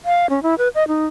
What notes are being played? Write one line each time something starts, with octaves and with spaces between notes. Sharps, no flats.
F5
C#4
E4
B4
D#5
D#4